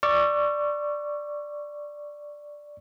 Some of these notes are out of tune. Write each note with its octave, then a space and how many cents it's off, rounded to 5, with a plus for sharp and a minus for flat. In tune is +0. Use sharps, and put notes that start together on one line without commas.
D5 +0 C#6 +0 E6 +45